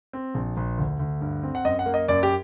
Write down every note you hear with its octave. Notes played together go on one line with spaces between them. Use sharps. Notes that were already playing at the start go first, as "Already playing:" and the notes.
C4
A#1
A#1
D2
D2
G2
C4
F#5
F#2 D#5
F#5
A#3
D#5
F#2 D5
G4